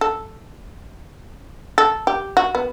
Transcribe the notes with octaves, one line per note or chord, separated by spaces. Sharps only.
A4
A4
G4
F#4
B3